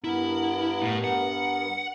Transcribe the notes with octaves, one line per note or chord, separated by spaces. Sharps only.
G2 B3 E4 A#4
A2
F#5